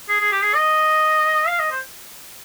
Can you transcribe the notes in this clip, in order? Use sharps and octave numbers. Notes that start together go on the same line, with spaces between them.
G#4
G#4
G4
G#4
D#5
F5
D#5
C5